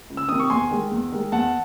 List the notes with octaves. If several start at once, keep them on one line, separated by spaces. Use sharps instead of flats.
C#2
E6
C3 D#3 D#6
C#6
E2 G#5 C6
D#3 G#3
E2
D#3 G#3
E2 F#5 A5